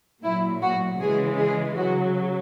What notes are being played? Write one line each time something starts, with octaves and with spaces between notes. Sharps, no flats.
A#2 F#3 E4
F#4
C#3 E3 G#3 G#4
G#4
C#3 F#3 F#4